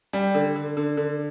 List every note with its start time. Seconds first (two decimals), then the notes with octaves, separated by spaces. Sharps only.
0.13 G3
0.35 D3
0.56 D3
0.77 D3
0.97 D3